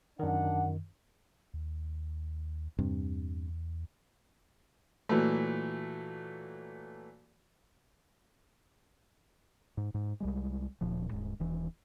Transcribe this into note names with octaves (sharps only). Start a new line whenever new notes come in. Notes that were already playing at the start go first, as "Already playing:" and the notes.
F#2 D#3 D4 F#5
D#2
E2 G2 C3
A#2 E3 F#3 A3
G#2
G#2
C2 G3 G#3
D1 A#2 F3
D#1 G#2
D#1 E3